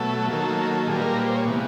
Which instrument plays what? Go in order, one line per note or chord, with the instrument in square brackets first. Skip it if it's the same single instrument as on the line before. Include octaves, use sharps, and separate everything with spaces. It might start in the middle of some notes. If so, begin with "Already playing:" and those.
Already playing: [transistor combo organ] B2 F#3 A3 A4
D#3 F#3 A#3 A4
A#2 G3 A#3 G#4
B4
A#4
B4
C5
C#5
C3 E3 G#3 B3